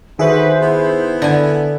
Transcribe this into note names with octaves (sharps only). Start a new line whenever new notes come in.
D3 D#3 F#4 G#4 B4 C5 E5
B3 E4
D3 G#5